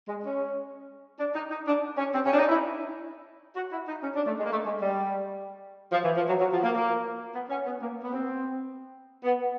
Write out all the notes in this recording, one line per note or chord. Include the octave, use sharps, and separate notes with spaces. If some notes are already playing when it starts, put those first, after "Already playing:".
G#3
C#4
D4
D#4
D#4
D4
C#4
C4
C#4
D4
D#4
E4
F#4
E4
D#4
C#4
D4
A3
G#3
A#3
A3
G#3
G3
F3
E3
F3
F#3
F#3
F3
A#3
A#3
B3
C#4
B3
A#3
B3
C4
B3